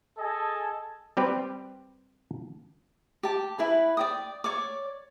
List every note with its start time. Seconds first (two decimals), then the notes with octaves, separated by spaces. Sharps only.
0.18 G#4 A4 D#5 G#5 A5
1.17 G3 C4 G4 B4
3.23 G4 A5
3.58 E4 B4 G#5
3.97 D5 G5 D#6
4.44 C#5 D5 D6